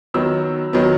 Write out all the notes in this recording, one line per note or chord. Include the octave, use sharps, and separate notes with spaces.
D#3 F#3 B3 E6
D#3 F#3 B3